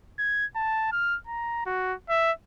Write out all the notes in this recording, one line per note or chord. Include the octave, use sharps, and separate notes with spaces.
G#6
A5
F6
A#5
F#4
E5